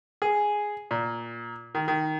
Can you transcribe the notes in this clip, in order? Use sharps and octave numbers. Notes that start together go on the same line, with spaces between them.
G#4
A#2
D#3
D#3